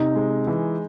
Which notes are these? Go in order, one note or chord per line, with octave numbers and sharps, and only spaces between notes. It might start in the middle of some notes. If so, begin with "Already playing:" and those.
Already playing: C3 D#4
G#3
E3